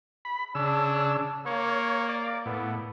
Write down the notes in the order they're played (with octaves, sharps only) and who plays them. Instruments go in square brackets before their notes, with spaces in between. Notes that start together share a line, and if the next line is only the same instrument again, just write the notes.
[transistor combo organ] B5
[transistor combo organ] C#3 E6 [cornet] D4
[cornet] A#3 [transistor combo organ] C#5
[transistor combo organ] D5
[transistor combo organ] A2 [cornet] B3